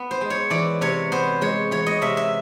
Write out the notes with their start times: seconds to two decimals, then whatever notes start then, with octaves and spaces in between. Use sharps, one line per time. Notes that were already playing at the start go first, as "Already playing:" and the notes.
Already playing: B3
0.11 C5
0.21 G#3
0.30 C#5
0.50 E3 D5
0.81 C3 C#5
1.12 B3 C5
1.41 G#3 C#5
1.71 E3 C#5
1.86 D#5
2.01 C3 E5
2.17 E5